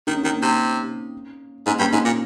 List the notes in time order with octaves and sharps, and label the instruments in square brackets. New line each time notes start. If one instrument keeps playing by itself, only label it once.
[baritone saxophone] D#3 [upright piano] D#4
[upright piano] C#4
[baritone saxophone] D#3 [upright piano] C4 D#4
[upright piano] A#3 C#4
[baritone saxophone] C3
[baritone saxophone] G#2 [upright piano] A#3 C#4
[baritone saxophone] G2 [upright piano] A#3 C#4
[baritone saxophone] G#2 [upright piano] C4 D#4
[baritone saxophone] A#2